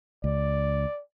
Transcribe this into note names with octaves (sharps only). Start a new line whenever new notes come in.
C#2 D5